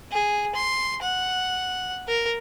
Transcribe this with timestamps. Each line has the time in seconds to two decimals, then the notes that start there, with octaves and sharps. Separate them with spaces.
0.12 G#4
0.55 C6
1.03 F#5
2.08 A#4